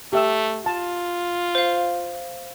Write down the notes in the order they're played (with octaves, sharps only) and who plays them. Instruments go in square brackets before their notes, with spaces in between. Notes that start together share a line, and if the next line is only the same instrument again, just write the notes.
[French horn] A3 [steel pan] G4 E5 E6
[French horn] F4 [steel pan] A5
[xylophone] C5 F5